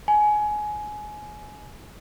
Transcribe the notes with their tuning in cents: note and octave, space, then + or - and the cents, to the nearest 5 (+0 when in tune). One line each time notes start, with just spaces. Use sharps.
G#5 +20